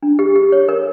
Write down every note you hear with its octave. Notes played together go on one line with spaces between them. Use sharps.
D4
G4
G4
C#5
A#4